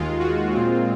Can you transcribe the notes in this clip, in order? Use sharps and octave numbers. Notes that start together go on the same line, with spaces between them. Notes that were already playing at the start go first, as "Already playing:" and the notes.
Already playing: D#2 D#3 G#3 F4
F#4
A#2 G#3 C4 F4